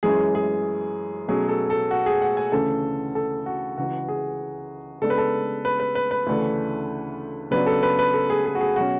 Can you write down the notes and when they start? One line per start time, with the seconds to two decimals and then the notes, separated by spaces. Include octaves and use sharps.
0.03 F#2 E3 G#3 C#4 G#4
0.35 G#4
1.28 B2 F#3 A3 C#4 G#4
1.48 A4
1.70 A4
1.91 F#4
2.06 G#4
2.22 F#5
2.37 G#5
2.52 D2 C#3 E3 A3 C#4 A4
3.15 A4
3.46 F#4
3.78 C#2 C#3 E3 F#4
4.08 G#4
5.02 C#3 G#3 B3 D4 A4
5.10 B4
5.18 A4
5.65 B4
5.80 B4
5.95 B4
6.11 B4
6.27 D2 C#3 E3 A3 D4
7.51 C#3 F#3 B3 D4 B4
7.66 A4
7.83 B4
7.99 B4
8.14 A4
8.30 G#4
8.46 G#4
8.55 F#4
8.61 G#4
8.76 B2 F#3 C#4 F#4